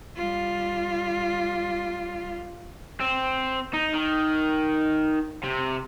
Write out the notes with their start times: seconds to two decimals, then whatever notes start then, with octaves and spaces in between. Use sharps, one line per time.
0.16 G3 F4
3.00 C4
3.73 D#4
3.94 D#3
5.43 C3